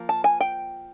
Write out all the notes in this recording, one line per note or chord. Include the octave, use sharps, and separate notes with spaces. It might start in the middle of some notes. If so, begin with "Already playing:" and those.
Already playing: F3 A#3
A5
G#5
G5